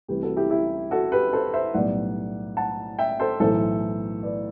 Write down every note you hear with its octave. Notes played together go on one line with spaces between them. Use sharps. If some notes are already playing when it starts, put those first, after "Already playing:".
C2 C3 E3 A3 G4 B4
F#4 A4
E4 G4
E4 G4
F#4 A4
G4 B4
A4 C5
C5 E5
B1 A2 G3 B3 D5 F#5
F#5 A5
E5 G5
A4 C5
B1 A2 E3 A3 A4 C5
B4 D5